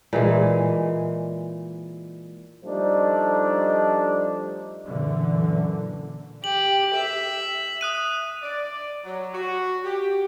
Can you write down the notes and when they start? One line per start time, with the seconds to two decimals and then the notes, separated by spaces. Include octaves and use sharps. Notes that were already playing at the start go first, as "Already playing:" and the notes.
0.13 A#2 E3 G#3
2.64 F3 G3 A3 D4 D#4
4.86 F#2 A#2 D3 E3
6.44 G4 F#7
6.94 E5
7.81 D#6 F#6 D#7
8.42 D5
9.04 F#3
9.33 F#4
9.84 G4